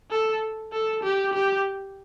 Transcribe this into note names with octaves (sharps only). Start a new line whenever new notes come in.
A4
A4
G4
G4